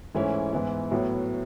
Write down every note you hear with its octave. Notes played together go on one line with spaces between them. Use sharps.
G#2 E3 A3 C#4 E4
G#2 E3 B3 E4
A2 F#3 B3 E4